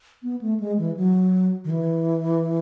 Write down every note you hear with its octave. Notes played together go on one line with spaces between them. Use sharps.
B3
A3
G#3
E3
F#3
D#3
E3